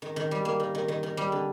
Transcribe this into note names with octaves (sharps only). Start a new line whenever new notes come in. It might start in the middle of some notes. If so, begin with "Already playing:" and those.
D#3
D#3
G3
A#3
D#3
D#3
D#3
D#3
G3
D3